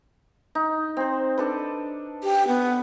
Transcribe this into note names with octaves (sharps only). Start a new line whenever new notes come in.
D#4
C4 C5
D4 A4 B4
G4
B3